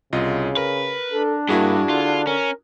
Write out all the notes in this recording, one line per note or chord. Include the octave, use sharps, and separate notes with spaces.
C2 C#3 F4 D#5
A#4 B4
D4 A4
G2 A#3 E4 F#4 G#4
D3 F4
C#4 A#4